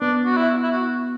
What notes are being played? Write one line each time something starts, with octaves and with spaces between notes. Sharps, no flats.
B3 D4
F#4
E4
E4
F#4